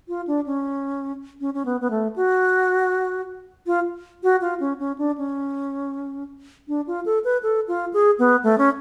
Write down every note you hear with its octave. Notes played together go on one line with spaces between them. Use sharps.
F4
D4
C#4
C#4
C#4
B3
B3
A3
F#4
F4
F#4
F4
C#4
C#4
D4
C#4
D4
F4
A4
B4
A4
F4
G#4
B3
A3
C#4